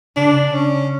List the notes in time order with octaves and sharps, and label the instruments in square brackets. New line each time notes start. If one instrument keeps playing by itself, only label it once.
[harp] C#3 [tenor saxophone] D4
[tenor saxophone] C#4